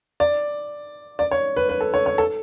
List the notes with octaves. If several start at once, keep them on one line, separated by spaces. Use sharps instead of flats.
D5
D5
C#5
B4
B4
A4
C#5
C#5
A4